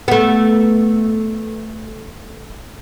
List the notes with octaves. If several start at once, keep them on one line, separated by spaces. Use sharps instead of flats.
A3 B3